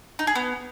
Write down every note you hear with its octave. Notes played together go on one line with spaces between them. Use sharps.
D#4
G#4
B3